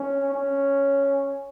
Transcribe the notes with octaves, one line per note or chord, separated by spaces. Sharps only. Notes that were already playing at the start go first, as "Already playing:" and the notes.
Already playing: C#4
C#4